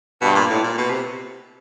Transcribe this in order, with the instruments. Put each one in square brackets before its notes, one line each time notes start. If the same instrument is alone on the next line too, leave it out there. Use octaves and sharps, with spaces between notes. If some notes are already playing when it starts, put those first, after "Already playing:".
[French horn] G2 [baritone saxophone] B2
[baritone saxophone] A#2
A2
A#2
B2
C3